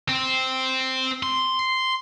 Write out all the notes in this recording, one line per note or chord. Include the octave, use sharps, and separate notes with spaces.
C4
C6